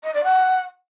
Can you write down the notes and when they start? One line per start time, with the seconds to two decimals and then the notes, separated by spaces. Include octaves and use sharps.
0.04 D#5
0.14 D5
0.24 F#5